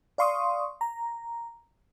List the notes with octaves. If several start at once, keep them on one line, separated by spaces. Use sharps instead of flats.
D5 F5 C6 C#6 D#6
A#5